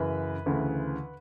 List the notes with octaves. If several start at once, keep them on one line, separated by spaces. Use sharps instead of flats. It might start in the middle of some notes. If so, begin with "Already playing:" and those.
Already playing: F#2 C#3 E3 B4
D2 C#3 E3